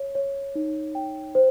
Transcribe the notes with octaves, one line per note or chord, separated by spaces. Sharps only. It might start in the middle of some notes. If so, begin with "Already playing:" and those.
Already playing: C#5
C#5
D#4
G5
C5